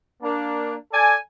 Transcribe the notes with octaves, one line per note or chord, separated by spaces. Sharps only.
A#3 D4
A4 D5 G#5